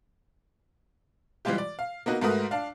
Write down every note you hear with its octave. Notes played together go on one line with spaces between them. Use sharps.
E3 G3 G#3 F4 G4
D5
F5
A#3 B3 D#4 F#4
G#2 A3 F#4 A#4 B4 D#6
D4 F5